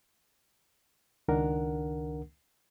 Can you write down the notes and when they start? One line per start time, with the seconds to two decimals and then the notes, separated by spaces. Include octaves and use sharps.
1.28 C#2 D#3 D4 A#4 F#5